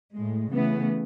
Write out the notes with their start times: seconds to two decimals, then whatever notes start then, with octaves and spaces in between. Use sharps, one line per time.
0.15 A2 G#3
0.53 C#3 E3 A3 B3